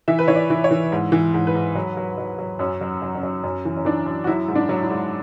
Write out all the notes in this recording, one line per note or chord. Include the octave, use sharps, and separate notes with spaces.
E3 E5
B4
E3 C#5
D5
E3
C#5
E3
G#2
E3
G#2
B4
G#2
F#3
F#3
F#3
F#3
F#2 C#4
F#3
F#3
C#4
F#3
F#2 C#4
E3
C#4
E3 D4
F#2
F#4
F#3 E4
G#2
D4
F#3
E4
G#2